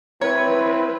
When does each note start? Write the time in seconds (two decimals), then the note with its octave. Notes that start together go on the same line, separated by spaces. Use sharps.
0.21 C4 E4 B4 C#5